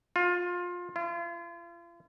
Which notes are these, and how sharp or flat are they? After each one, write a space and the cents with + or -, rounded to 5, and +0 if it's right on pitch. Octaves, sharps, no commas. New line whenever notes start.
F4 +20
F4 -40